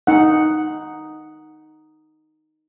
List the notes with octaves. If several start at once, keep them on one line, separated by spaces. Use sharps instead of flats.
D#4 F#5